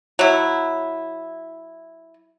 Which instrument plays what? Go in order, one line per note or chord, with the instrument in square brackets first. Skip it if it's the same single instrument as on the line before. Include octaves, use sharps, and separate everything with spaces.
[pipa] F#3 E4